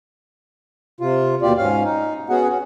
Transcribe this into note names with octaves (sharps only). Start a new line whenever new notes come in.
C3 F4
D#2 B2 F4 G4 D5
G#2 C#4 F5
D#4
B3 C#4 F#4 G#4 F#5
C#4 F#4